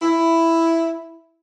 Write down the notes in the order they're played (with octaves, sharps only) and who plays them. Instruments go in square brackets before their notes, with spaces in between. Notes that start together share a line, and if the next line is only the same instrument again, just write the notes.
[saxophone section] E4